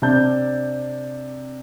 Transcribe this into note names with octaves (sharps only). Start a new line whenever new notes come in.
C3 D4 A5 G6